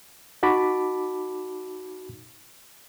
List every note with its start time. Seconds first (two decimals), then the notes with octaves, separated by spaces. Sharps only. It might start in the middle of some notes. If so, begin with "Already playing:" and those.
0.43 D#4 F#4 A5 B5 D6